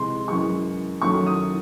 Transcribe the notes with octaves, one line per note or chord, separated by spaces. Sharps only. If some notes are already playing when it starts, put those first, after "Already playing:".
Already playing: C3 E3 G#3 C6
F#2 E3 G#3 C#6
F#2 D#3 F#3 A3 C#6
D#6